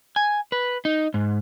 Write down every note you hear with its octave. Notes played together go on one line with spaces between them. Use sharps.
G#5
B4
D#4
G#2